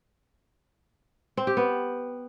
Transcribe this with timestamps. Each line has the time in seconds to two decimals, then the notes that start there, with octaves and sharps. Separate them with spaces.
1.37 C4
1.47 G4
1.57 B3